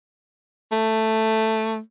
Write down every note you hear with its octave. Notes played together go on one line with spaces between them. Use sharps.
A3